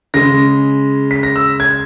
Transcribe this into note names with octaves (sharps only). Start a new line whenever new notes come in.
C#3 G#3 A#6
B6
A#6
E6
G#6